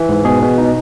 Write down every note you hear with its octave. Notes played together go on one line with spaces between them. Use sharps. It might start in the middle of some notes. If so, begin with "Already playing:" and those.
Already playing: E3
G#2
B2 G#4
B2
D#4